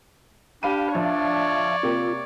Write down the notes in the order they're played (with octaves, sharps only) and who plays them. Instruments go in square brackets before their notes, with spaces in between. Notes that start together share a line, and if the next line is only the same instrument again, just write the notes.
[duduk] D4 [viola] G4 [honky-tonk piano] F5 B5 D#7
[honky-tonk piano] F3 [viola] C#5 D5 [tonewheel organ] E5 F5 A5
[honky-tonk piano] C3 A#3 G4 [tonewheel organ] F4